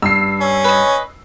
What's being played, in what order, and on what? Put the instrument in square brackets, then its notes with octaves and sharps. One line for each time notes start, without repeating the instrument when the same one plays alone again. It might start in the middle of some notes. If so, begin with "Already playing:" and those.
[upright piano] G2 [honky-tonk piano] E6 C7
[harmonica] C#4
[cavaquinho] B4 D#5